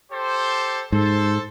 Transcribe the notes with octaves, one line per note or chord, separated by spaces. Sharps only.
G4 A4 C5
G#2 A4 C5